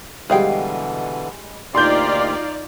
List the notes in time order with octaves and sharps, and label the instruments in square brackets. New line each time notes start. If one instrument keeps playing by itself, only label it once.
[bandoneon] B2 D3 E3 [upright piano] G3 G#3 [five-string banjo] G#4 F5 G5
[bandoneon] D2 A#3 G4 [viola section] D#4 F4 D5 [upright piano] C6 G6